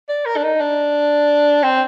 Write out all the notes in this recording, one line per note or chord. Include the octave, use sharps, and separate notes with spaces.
D5
A#4
D4
D#4
D4
C4